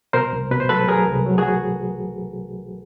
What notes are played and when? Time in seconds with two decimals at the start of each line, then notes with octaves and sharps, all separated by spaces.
0.13 B2 A#4 C5
0.33 C2
0.51 B2 B4
0.60 C5
0.69 F#3 A4 B4
0.88 F#3 G#4 A#4
1.07 C2
1.26 F#3
1.38 F#4 G#4